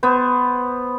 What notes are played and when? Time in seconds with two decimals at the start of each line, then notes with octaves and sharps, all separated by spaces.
0.03 B3 C5